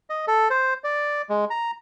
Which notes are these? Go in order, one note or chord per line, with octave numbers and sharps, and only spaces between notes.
D#5
A4
C5
D5
G#3
A#5